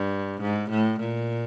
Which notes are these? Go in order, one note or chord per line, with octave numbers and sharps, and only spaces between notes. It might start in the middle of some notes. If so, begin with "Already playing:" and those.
Already playing: G2
G#2
A2
A#2